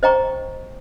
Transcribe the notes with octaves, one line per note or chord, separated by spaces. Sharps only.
C5 D#5 G5 A#5 C#6